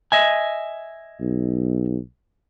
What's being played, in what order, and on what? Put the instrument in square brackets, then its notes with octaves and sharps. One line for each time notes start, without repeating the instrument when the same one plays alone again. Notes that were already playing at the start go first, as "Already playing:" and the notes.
[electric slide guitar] D#5 E5 G#5
[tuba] B1